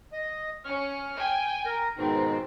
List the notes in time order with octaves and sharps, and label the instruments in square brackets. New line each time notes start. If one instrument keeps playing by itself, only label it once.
[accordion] D#5
[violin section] C#4 [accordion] F6
[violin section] G5 G#5
[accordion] A#4
[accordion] G#2 B2 D#3 [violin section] C4